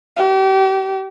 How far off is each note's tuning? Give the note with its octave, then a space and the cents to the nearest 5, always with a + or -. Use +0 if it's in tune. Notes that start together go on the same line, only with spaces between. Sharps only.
G4 -35